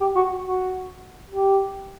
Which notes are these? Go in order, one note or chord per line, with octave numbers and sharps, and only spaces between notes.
G4
F#4
F#4
G4